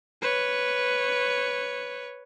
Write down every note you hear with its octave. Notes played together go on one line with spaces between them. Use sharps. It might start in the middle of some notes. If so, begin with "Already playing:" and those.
B4 C#5